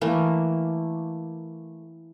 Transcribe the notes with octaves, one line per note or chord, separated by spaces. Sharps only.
E3 A3 A#3